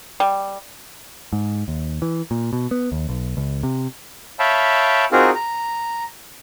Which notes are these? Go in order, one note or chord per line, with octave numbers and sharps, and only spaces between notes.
G3
G#2
D#2
E3
A#2
B2
B3
D#2
B1
C#2
C3
C#5 E5 F5 G5 A5 B5
C4 D#4 F4 F#4 G#4 A#4
A#5